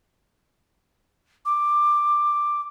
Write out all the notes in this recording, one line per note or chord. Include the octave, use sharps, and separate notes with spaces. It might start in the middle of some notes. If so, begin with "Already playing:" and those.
D6